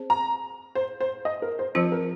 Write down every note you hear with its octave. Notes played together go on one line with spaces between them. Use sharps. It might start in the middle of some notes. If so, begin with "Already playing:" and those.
Already playing: C4 G#4 C5
A#5
C5
C5
D#5
A#4
C5
F3 C4 F4 C5
A#4